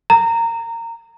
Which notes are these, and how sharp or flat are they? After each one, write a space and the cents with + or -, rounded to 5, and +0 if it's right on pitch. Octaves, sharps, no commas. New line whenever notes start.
A#5 -20